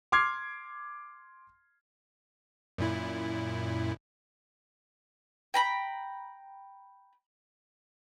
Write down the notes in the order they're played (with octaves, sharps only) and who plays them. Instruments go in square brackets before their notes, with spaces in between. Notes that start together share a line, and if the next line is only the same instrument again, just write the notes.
[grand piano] C6 D6 F6 G#6 C7
[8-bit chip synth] F#2 A#2 E4
[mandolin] G5 A#5 B5